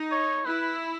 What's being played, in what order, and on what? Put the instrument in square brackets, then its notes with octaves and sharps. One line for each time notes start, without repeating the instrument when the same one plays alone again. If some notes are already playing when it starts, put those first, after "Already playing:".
Already playing: [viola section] D#4
[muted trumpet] C#5
[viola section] E4 [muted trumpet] B4